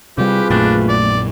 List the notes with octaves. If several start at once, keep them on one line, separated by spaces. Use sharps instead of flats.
C3 G3 F4 G4 G#4 B4
A#1 F#2 A#2 A3 C4 D4 G5
D5